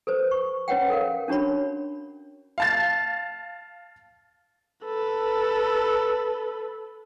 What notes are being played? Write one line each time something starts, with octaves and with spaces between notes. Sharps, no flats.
A4 B4 C5
C#6
C#4 B4 C#5 F#5 G5
A4 A#4 F5
C#4 D4 F#4 C#5 B5
F5 A5 A6
A4 B4